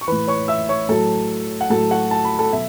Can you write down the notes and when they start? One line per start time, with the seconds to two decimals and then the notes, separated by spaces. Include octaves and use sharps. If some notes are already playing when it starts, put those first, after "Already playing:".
0.01 C#6
0.08 A2 E3 B4 B5
0.28 C#5 C#6
0.48 E5 E6
0.69 C#5 C#6
0.89 A2 F#3 A4 A5
1.61 F#5
1.70 A2 F#3 A4 A5
1.91 F#4 F#5
2.11 A5
2.25 B5
2.39 A4 A5
2.53 B2 F#3 E5